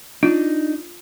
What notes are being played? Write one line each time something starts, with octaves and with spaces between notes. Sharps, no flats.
D4 D#4 F4